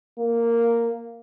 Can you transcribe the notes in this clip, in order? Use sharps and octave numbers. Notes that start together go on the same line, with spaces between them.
A#3